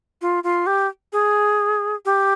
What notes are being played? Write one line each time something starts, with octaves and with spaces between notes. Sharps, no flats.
F4
F4
G4
G#4
G4